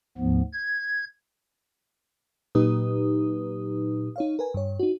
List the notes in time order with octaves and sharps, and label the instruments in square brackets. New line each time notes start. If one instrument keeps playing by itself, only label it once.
[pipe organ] D2 G#2 F3 B3
G#6
[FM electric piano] A#2 F#3 D#4 G4 B4 D#6
D#4 C#5 F5
A#4 B4 G#5
G2 C#5
D#4 F#4